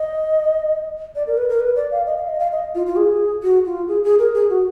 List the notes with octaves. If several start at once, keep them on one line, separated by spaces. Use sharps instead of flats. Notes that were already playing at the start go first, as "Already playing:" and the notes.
Already playing: D#5
D5
A#4
B4
A#4
B4
D5
F5
D#5
F5
D#5
F5
D#5
F4
F4
G#4
F#4
F4
G#4
G#4
A#4
G#4
F#4